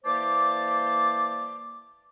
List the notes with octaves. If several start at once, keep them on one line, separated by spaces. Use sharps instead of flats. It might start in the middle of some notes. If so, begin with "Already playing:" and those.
E3 A#3 C5 D5 A5 D6